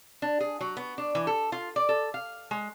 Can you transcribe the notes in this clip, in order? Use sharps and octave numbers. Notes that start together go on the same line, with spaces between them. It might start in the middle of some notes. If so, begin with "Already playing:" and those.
D4
G#4
F#3
B3
D4
E3
A4
F4
D5
A4
F5
G#3